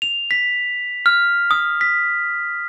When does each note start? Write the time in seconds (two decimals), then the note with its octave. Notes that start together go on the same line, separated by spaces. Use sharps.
0.02 F7
0.31 B6
1.06 F6
1.51 D#6
1.81 B6